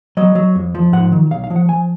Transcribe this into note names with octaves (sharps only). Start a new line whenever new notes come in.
F#3 D#5
F#3
F2
F3
G#2 F#5
D#3
B1 F5
F5
F3
F#5
F3 G#5